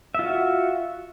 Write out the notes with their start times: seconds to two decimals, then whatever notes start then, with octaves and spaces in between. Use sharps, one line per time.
0.15 E5
0.19 F4
0.24 F#4